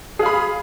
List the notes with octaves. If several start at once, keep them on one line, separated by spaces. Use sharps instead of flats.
G#4 F5 B5